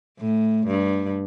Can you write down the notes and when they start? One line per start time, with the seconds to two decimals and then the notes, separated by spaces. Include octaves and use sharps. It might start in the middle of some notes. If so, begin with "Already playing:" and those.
0.19 A2
0.67 G2